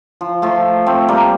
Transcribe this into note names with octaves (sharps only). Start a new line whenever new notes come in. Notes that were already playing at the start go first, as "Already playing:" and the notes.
F3
F3 A3
A3 C4
G3 A#3